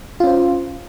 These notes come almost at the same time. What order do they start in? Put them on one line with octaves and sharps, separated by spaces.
F4 C#4 C5